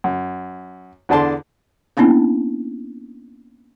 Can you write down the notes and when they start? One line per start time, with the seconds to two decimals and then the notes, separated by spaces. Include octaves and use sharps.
0.04 F#2
1.09 E2 D3 D4 A5 C6
1.97 A#3 B3 C#4 D4 E4